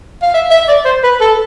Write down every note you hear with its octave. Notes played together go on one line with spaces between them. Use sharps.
F5
E5
E5
D5
C5
B4
A4